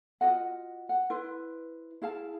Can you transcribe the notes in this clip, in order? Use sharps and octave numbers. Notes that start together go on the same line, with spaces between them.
F4 F#4 D#5 F#5
F#5
E4 B4 C5
E4 G#4 F5 A5